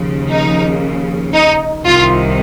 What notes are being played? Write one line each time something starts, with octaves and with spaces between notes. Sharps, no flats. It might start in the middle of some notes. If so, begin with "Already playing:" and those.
Already playing: D#2 C#3 F3
D#4
D#4
C2 C3 D#3 F4